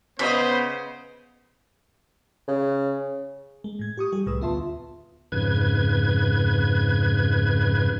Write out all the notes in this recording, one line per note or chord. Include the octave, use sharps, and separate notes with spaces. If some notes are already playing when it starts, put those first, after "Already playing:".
C#3 B3 C5 C#5 D#5 B5
C#3
G#3
A2 G#6
G4 C#6 D#6
G3 G4 G#4
C2 A2 B4 D#6 E6
D2 B3 F4 E5 A5 C6
F2 G#2 C#3 B4 G#6